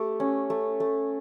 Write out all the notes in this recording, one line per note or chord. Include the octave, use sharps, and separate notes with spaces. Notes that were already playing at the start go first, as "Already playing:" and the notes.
Already playing: A3 G4
C#4
A3
A3